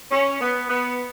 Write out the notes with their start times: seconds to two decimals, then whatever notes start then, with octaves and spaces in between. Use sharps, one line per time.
0.11 C#4
0.40 B3
0.70 B3